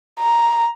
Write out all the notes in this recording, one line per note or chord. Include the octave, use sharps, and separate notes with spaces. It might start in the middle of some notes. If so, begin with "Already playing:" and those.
A#5